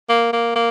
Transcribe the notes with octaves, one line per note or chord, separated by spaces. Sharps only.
A#3
A#3
A#3